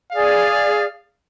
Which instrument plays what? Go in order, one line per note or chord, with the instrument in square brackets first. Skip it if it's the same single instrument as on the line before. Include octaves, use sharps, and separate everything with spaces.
[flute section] G#4 D5 [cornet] F5